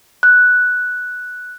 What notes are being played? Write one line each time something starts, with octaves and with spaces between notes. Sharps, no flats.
F#6